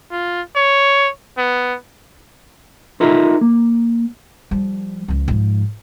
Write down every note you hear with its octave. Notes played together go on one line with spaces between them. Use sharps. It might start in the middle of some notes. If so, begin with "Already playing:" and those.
F4
C#5
B3
D#4 F4 A4 A#4 D#5 E5
A#3
F3 G3
C#2 F3
G#2 F3